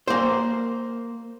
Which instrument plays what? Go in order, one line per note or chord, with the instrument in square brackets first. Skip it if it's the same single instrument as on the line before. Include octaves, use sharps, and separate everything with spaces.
[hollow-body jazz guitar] A#3 C5